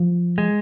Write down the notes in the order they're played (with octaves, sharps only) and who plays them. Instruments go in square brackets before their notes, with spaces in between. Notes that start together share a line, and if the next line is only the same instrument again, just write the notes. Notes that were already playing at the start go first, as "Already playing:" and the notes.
Already playing: [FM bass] F3
[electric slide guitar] G#3